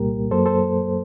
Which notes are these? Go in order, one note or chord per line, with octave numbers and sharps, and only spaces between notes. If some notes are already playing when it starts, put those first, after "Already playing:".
Already playing: C2 A#2 G3 A#3 G4 A#4
F#2 F#3 A#3 A4 C5
A4 C5